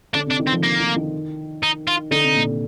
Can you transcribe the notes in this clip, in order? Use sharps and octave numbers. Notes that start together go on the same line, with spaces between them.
D3 D4
C3 D4
D#3
C4
F3
A#3
D#3
D#3
D#4
F4
D3 D#4
C3
A#2
C3